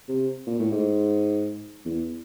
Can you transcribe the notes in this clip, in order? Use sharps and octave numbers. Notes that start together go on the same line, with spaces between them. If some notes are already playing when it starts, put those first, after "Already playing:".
C3
A#2
A2
G#2
E2